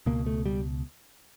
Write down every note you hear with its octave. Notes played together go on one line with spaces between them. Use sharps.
C#2 B2 A#3
A3
G3